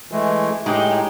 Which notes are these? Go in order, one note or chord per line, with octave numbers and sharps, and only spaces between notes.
E3 G#3 A3
A2 G#3 D#4 G4